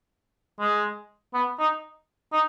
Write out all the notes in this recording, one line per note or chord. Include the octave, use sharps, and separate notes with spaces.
G#3
B3
D#4
D#4